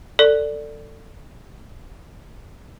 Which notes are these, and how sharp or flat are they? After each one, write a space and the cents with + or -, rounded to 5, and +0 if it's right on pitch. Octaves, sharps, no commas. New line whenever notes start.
A4 +20 D5 +0